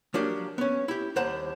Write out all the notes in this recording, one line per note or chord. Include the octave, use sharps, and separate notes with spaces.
F3 F#3 A#3 D4 G4
B3 C#4
E4 G4
D#2 G3 C5 F#5 A5 A#5